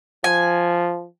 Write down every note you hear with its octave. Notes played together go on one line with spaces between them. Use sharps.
F3 G#5